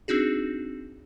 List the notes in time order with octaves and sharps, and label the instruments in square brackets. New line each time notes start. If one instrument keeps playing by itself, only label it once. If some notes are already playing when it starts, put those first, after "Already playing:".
[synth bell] C4 D4 D#4 F#4 G#4